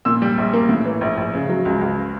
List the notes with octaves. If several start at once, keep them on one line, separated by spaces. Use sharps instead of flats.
A#2 E6
G3
A#1
A#3
A2
E3
A#1
A#1
C#3
F#3
C#2
C#2